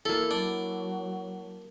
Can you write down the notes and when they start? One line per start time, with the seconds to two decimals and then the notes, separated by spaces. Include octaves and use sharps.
0.05 A#3 E4 A4
0.31 F#3 D4